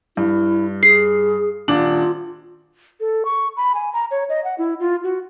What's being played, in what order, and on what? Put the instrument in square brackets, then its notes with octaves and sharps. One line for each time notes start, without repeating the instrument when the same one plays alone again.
[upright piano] G2 [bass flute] E4
[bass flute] G#4 [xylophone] C7
[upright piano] D#1 D4 F#7 [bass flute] F4
[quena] A4
C#6
B5
G#5
A#5
C#5
D#5
F#5
E4
F4
F#4